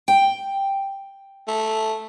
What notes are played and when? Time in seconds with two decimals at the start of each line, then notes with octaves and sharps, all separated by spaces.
0.08 G5
1.48 A3